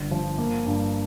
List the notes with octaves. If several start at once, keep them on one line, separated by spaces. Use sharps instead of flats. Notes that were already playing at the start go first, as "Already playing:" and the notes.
Already playing: G1 G2
F3
A#3
G2